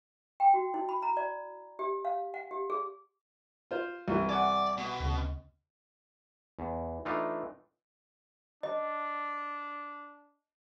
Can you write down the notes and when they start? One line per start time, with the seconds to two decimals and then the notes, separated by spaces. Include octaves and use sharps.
0.40 G5
0.54 F#4
0.74 E4
0.89 B5
1.02 A#5
1.17 D5
1.79 G4
2.05 F5
2.34 F#5
2.51 G4
2.70 G#4
3.71 F4 C5
4.08 C2 E3
4.29 D5 F#5 G#5
4.78 B2
5.00 D2 C#3
6.59 E2
7.05 E3 A3 D4 D#4 F4
8.63 D4 D#5